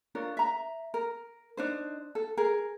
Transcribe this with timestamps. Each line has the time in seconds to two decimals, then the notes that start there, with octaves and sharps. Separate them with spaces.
0.15 D4 F4 A#4 C#5
0.37 E5 A#5
0.94 A#4
1.57 D4 D#4 C5
2.15 A4
2.37 G#4 A#4